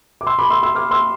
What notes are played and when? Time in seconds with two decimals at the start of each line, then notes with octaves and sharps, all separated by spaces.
0.21 D6
0.27 C6 E6
0.39 B5 D6
0.50 C6 E6
0.63 C6 E6
0.75 D6 F6
0.91 C6 E6